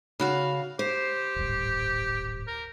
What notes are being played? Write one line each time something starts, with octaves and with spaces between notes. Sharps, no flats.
C#3 F#4 F5
G4 C5
D1 G#1 G2
A#4